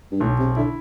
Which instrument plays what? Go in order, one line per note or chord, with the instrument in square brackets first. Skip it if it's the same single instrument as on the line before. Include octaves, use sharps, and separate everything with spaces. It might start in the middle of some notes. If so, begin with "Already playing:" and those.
[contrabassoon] G2
[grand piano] B1 [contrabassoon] A2
[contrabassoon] C3
[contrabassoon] D3 [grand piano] E4